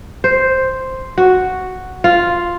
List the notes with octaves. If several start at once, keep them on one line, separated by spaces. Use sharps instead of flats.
C5
F#4
F4